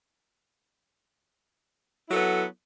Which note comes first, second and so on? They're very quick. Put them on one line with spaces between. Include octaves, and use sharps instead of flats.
E4 F#3 A4 B3